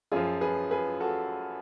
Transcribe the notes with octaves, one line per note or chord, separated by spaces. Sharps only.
F#2 F3 F4 G#4
G#4 B4
G#4 B4
F#4 A4